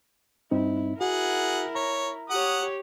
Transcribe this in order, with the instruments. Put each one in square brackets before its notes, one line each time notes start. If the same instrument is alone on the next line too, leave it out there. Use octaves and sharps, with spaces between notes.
[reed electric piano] G2 C4 D#4 [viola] E4
[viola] E4 A#4 [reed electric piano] F#4 [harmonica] G#4 F#5
[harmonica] C#5 [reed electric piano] A#5
[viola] G4 C#5 [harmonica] F#5 D#6